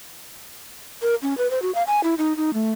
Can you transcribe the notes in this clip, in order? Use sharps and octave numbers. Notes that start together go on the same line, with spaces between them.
A#4
C#4
B4
C5
F#4
F5
G#5
E4
D#4
D#4
A3